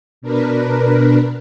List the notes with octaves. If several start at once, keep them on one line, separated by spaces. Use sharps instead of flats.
B2 D4 A#4 B4